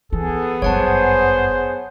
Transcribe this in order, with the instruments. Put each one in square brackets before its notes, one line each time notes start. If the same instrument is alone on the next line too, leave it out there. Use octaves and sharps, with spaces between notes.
[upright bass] E3 [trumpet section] B3 G#4 [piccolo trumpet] A4
[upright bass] G1 F#2 [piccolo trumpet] C5 [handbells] C#5 F#5 A5